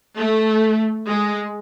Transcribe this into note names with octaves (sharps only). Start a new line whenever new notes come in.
A3
G#3